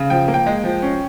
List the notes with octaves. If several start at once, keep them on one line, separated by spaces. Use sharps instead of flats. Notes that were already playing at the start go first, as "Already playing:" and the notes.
Already playing: C#3
F3 G5
A#3
G5
G#3
F3
C#4